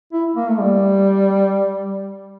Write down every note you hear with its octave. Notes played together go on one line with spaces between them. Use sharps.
E4
A#3
A3
G3